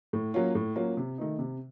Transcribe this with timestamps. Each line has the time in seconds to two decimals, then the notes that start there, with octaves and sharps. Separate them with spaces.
0.13 A2
0.34 F#3 A#3 C#4 F4
0.55 A2
0.76 F#3 A#3 C#4 F4
0.97 C3
1.18 D#3 A3 D#4
1.39 C3